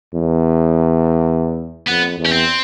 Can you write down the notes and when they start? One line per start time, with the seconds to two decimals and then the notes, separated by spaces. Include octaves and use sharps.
0.14 E2
1.88 F2 B3
2.18 E2
2.26 C#4
2.32 C4